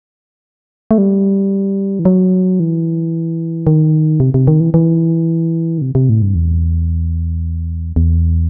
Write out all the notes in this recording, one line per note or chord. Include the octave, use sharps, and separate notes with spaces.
A3
G3
E3
F#3
E3
D#3
C3
C3
D#3
E3
E3
D#3
C3
C3
A2
G2
E2
E2